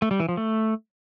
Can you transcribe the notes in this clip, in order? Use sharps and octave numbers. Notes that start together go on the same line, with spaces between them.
A3
G3
E3
F3
A3